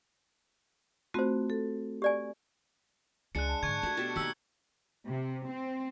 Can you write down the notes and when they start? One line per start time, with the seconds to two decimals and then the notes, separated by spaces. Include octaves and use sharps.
1.14 A3 C4 F4 F#4 C5
1.50 A4
2.02 G4 D5 G#5
3.35 C#2 G#3 D4 F#6 C#7
3.47 A5
3.63 G#2 D3 C#6 G#6
3.83 A3 D4 F#4
3.97 B2 G4 A4
4.16 D#3 A#3 D#4 G4 E6 C#7
5.08 C3
5.49 C4